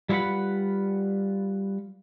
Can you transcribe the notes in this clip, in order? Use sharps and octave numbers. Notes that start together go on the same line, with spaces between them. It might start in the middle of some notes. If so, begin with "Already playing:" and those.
G3 E4 F4 B4 F#5 B5